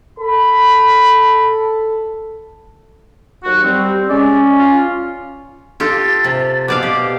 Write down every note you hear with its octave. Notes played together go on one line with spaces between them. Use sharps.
A4 B5
D#2 F#3 F#4
G3 C4
G#3 C#4 D5
F4
F4 G4 A4 A6
C3
B2 D5 F5 D6
G4